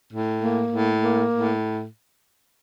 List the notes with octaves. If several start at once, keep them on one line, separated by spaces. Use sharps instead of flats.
A2
A#3
A2
A#3
A2